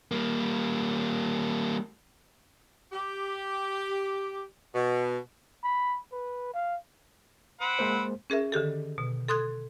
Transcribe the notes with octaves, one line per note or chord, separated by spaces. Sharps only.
G3 A#3
G4
B2
B5
B4
F5
C4 F#5 B5
G#3 A#3 C5
C#4 G#4 A#4 E5
D3 D#3 G4 A4
B2
A4 C6 D#6 F#6 G#6